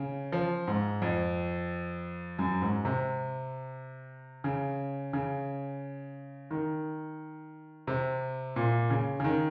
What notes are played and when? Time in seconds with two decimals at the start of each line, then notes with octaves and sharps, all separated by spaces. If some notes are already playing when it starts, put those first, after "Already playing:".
Already playing: C#3
0.32 F3
0.67 G#2
1.02 F2
2.39 F#2
2.62 G#2
2.85 C3
4.44 C#3
5.13 C#3
6.51 D#3
7.87 C3
8.56 A#2
8.90 C#3
9.20 C#3
9.24 D#3